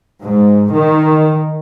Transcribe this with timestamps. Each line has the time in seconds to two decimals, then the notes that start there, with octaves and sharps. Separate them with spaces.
0.20 G#2
0.72 D#3